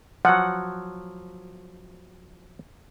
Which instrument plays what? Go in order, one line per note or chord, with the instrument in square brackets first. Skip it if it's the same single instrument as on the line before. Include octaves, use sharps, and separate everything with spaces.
[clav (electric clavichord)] F3 F#3 [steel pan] F#5